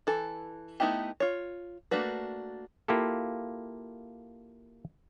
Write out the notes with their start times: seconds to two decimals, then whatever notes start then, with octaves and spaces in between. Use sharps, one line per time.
0.07 E3 A4
0.80 A3 B3 D#4 E4 G4
1.20 F4 C#5
1.91 A3 A#3 D4 F#4 B4
2.88 A#3 E4 F4 G4 A4